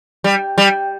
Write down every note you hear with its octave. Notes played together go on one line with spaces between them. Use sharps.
G3
G3